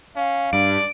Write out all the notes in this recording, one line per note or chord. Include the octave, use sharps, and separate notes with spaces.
C#4 F5
G2 D5 D7